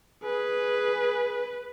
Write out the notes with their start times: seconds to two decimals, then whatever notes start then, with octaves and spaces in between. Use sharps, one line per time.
0.24 G#4 B4